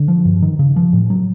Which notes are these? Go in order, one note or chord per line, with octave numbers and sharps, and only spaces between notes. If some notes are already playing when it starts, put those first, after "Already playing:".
Already playing: D3
F3
G2
D#3
C#3
F3
A2
F#3